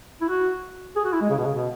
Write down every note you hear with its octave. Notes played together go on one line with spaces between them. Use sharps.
E4
F#4
G#4
F#4
E4
G#3
C#3
B2
C#3
B2